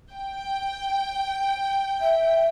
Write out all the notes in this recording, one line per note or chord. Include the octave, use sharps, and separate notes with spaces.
G5
E5